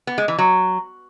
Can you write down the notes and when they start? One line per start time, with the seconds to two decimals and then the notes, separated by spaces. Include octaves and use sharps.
0.07 B3
0.18 G#3
0.28 E3
0.38 F#3